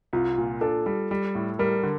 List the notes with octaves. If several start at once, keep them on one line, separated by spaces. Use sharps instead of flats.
C2 F4
A#2
D4 A4
G3
G3
A2
G3 A#4
D3